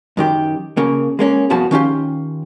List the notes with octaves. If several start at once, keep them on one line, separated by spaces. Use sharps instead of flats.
F#2 D#3 G4
C#3 A#3
G#3 A#3 C#4
C2 F#2 F3 B3 F#4 A5
D#3 C#4 F4 G4